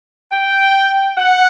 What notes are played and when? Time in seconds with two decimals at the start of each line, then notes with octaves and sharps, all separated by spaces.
0.32 G5
1.17 F#5